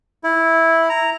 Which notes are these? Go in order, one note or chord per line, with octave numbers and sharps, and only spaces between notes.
E4
A#5